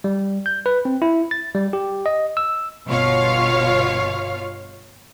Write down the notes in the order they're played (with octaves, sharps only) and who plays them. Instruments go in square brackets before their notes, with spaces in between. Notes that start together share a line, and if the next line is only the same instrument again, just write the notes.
[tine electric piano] G3
G6
B4
C4
E4
A6
G3
G4
D#5
E6
[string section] G1 B2 F4 C#5 F5